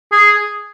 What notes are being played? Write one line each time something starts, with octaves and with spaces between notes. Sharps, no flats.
G#4